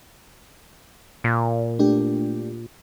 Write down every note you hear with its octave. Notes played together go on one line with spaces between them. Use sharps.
A#2
A3 D4 G4